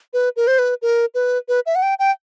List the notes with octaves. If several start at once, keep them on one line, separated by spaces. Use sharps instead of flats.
B4
A#4
C5
B4
A#4
B4
B4
E5
F#5
G5
G5